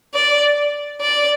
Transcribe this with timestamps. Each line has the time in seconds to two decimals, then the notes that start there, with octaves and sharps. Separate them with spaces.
0.14 D5
1.01 D5